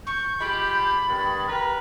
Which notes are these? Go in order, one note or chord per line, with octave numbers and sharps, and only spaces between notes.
C#6 G6
G#3 F4 G4 B5
G2 D#3 G#3 A6
G4 A#4 B4 A#5